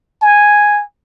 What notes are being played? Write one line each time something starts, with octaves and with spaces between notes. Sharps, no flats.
G#5